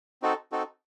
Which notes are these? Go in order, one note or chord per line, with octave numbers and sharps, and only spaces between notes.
C4 D#4 F#4 A4
C4 D#4 F#4 A4